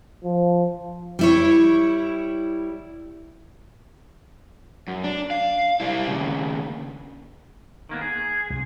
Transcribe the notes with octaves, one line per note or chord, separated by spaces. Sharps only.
F3
G3 E4 C#5
F#2
D4
F5
G3 E4
D#2 C#3
D#3 A#3 B3
G#4
C2